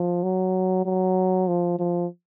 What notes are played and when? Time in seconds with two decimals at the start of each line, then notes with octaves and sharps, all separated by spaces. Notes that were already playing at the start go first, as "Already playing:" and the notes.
Already playing: F3
0.23 F#3
0.85 F#3
1.48 F3
1.79 F3